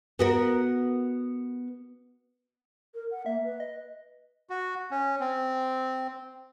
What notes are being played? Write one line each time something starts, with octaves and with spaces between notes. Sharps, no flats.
B3 F#4 A#4
A#4
F#5
A#3 E5
B4
D#5
F#4
C#4
C4